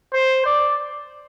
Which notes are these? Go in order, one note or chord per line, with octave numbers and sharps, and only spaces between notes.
C5
D5